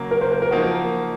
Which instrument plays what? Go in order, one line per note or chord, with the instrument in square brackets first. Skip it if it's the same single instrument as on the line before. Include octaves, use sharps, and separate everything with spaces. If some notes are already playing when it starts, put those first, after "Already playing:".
Already playing: [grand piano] C#3 F#3 A#3
[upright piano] A#4
C5
A#4
A#4
[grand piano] F3 A#3 D#4 F#4